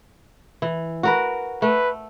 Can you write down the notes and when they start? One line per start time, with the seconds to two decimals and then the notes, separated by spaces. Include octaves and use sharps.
0.62 E3
1.03 F#4 A#4 B4
1.62 A3 B4